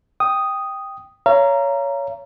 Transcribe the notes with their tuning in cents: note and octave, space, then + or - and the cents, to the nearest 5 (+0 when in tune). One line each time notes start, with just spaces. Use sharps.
G5 +0 D#6 +0
C#5 +15 F5 -35 A#5 +0